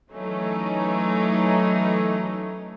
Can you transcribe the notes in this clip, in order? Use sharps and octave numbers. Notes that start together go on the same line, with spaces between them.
E3 F#3 A3 C#4 D#4